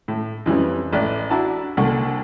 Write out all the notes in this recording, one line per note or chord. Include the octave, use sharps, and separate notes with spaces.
A2
F2 E3 G3 C#4
A1 D5 F#6
D4 E4 F#4 D5 A5 A#5
C2 D3 A#3 F#5 C#6